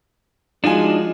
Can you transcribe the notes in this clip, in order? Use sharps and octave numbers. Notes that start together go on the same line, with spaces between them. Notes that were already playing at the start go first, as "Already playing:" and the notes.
F3 G#3 D4 D#4 F#4 G#5